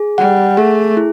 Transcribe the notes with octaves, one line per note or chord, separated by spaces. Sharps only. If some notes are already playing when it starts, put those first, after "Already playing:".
Already playing: G#4
G3 F#5
A3 G#4
E4